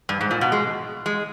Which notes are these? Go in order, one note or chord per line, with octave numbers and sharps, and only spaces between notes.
G2
G#2
A#2
B2
G#3
G#3